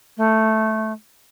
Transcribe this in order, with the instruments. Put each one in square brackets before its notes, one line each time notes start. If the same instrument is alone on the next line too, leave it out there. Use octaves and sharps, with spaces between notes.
[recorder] A3